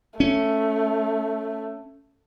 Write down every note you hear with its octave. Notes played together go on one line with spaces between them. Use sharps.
A3 C#4